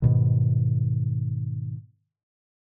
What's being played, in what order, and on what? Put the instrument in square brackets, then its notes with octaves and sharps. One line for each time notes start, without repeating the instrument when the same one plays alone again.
[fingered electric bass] G#2 B2 D#3